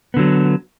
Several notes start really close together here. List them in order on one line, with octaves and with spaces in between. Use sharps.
B3 D3 F#3